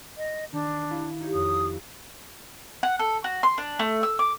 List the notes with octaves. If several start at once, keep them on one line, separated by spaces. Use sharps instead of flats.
D#5
D#3 D4 E7
E4 F5
D#4 G4 C#5
F2 D#6
F#5
A4
F#4
C6
D4
A3
E6
D6